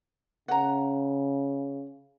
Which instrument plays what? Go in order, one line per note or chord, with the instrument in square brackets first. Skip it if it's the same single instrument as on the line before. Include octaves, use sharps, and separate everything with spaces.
[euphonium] C#3 [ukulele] F#5 A#5